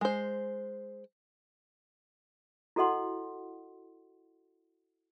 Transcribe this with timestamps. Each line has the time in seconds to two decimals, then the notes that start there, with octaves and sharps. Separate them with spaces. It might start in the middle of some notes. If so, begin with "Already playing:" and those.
0.01 G#3 C5
2.76 E4 F#4 A4 D#5 F#5 C6